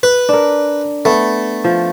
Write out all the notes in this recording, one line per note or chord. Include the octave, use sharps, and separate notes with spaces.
B4
D4 A#4
A3 B3
F3